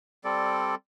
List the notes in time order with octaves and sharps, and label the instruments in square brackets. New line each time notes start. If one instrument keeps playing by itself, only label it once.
[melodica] G3 C4 A4 D5